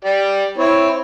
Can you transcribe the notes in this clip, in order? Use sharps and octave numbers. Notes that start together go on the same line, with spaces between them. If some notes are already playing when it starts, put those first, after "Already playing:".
G4 D5
C4 E4 C#5